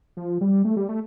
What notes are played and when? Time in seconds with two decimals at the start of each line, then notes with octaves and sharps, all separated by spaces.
0.17 F3
0.41 G3
0.65 A3
0.77 G3
0.89 A3